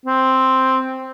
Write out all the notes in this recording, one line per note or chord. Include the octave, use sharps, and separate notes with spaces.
C4